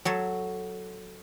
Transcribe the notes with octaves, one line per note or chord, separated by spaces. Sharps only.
F#3 A4 C#5